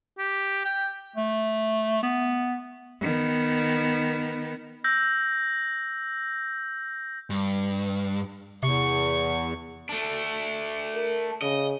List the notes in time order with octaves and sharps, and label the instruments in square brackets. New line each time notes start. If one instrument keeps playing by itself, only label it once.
[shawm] G4
G5
[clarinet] A3
B3
[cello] D#3 B3
[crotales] E6 G6 A#6
[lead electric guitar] G2
[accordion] E2 [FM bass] C3 [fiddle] C#6
[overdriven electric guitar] A3 D4
[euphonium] A#4
[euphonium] C#3 [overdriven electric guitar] D#5